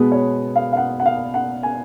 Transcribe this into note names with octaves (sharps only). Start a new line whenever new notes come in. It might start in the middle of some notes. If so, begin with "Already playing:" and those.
Already playing: B2 G#3 B3 B4
C#5
F5
F5
F#5
F#5
F5
F#5
G#5